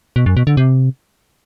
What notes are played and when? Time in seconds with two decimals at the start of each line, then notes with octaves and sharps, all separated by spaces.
0.16 B2
0.26 F#2
0.37 B2
0.47 D3
0.57 C3